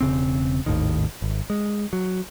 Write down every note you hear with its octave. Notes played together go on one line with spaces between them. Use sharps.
E1 C#3 C4
G#1 D#2 A2 D#3
G#1
G#3
F#3